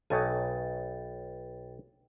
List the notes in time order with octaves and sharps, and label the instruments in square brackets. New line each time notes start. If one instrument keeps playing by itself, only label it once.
[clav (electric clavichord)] B1 G#5 [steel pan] A4 C#5 D#5 [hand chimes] B4 G5 A6